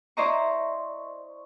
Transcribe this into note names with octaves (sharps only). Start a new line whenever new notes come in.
E4 C5 D5 D#5 A#5 C#6